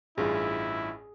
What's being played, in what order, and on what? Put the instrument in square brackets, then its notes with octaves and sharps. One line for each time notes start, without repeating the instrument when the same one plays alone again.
[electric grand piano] A1 G2 F4 [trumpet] E4 [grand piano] G#4